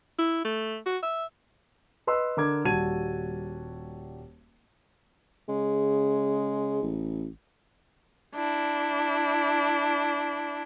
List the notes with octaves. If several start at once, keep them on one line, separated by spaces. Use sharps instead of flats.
E4
A3
F#4
E5
B4 D#5 C6 E6 F#6
D3 A#4 D6 G#6
D#1 G3 F#4 A5 G#6 D#7
C#3 G#3
A1
D4 E4